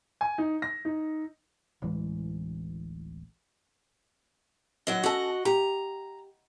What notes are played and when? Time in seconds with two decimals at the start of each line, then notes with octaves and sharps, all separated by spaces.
0.21 G#5
0.38 D#4
0.62 A#6
0.85 D#4
1.82 D1 A1 E3 G#3
4.87 D#2 F#3 D#5
5.03 C#4 F#4 A4 D#5 A5
5.45 G4 A#5